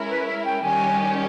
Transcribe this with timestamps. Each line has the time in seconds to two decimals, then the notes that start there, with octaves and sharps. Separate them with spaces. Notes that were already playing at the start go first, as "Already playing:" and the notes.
Already playing: G#3 C#4 E4 A#4
0.09 B4
0.27 E5
0.45 G5
0.63 D#3 G3 C#4 G4 G#5